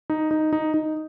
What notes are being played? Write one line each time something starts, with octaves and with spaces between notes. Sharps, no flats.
D#4
D#4
D#4
D#4